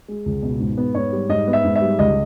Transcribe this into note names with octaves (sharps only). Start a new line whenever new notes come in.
G#3
C#2
B2
G#2
B3
G#2 C#5
G3
G#2 D#5
B3
E5
G#2
E5
G3
C#2 D#5